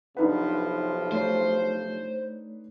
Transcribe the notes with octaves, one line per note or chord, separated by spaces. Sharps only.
B1 C3 F3 D4 D#4 B4 F#5
A3 C5 C#5